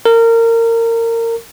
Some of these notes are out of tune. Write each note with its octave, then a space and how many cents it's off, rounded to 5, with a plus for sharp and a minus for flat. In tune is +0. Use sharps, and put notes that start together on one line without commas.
A#4 -25